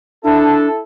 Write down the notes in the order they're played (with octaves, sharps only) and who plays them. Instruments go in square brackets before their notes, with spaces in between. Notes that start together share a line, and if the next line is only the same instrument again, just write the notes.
[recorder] D4 [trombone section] E4 A4